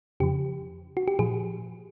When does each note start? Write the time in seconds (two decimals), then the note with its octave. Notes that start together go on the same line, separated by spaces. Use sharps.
0.20 F2 C#3 F3 G4
0.97 F#4
1.08 G4
1.19 A#2 F3 G#4